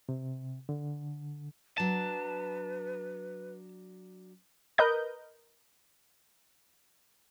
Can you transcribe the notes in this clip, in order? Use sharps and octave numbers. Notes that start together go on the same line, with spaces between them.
C3
D3
F#3 D4 B4 A5
A#4 B4 D#5 G6